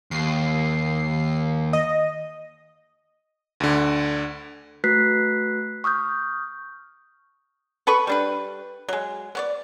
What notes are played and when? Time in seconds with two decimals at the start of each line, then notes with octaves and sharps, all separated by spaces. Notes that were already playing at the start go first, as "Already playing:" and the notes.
0.11 D#2 C7
1.73 D#5
3.60 D2 D3
4.84 A3 F#4 B4 F#6 B6 C7
5.84 C#6 D#6 F6 G6
7.87 A4 B4 B5 C#6
8.07 G3 D4 B4
8.89 F#3 G#3
9.35 B3 C#5 D5